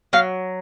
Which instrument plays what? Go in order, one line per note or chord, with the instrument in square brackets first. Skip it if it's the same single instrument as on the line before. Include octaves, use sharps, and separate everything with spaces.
[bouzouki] F#3 F5